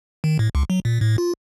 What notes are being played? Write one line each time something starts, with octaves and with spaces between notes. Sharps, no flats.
D#3
A2
C#2
F#3
A#2
A2
F4